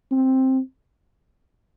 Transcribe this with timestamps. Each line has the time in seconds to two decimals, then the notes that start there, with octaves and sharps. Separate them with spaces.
0.11 C4